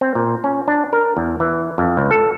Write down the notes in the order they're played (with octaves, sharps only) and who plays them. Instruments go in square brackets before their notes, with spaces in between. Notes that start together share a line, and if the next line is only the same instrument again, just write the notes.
[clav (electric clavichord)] C4
A#2
C#4
D4
A#4
E2
E3
F2
C#2
A4